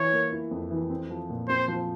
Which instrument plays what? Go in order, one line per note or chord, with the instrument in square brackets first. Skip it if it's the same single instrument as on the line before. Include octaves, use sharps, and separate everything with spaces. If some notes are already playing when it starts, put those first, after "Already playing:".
Already playing: [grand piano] E3 E4 [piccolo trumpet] C#5
[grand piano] A#3
E4
F2
E3
C4
F3
A#2
[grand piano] C4 [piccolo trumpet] C5
[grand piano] F3